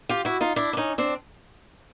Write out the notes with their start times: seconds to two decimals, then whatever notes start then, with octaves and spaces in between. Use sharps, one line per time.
0.09 F4 G4
0.25 E4 F#4
0.41 D#4 F4
0.56 D4 E4
0.73 D4
0.77 C#4 D#4
0.98 C4 D4